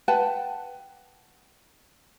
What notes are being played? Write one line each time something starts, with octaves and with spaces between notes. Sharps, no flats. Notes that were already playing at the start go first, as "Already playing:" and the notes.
B4 F#5 G5 A5